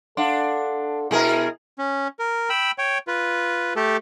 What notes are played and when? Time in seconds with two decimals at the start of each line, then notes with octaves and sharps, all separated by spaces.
0.17 D4 A4 F5 F#5 C6
1.11 B2 E4 G#4 A#4
1.79 C#4
2.19 A#4
2.50 G5 B5 E6
2.78 C#5 G5
3.07 F4 B4
3.76 A3 G4 A4